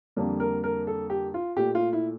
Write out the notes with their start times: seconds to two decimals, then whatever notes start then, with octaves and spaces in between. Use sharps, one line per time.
0.16 F2 D3 G3 A#3
0.40 A#4
0.64 A#4
0.87 A4
1.10 G4
1.34 F4
1.57 A#2 A3 G4
1.75 F4
1.93 E4